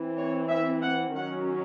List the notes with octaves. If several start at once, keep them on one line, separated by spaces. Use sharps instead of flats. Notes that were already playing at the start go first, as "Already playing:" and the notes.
Already playing: E3 C4
C#5
E5
F#5
D#3 F#3 C#4 F#5